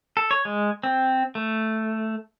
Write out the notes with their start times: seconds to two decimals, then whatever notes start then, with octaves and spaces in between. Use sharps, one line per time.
0.17 A4
0.31 C#5
0.45 G#3
0.84 C4
1.35 A3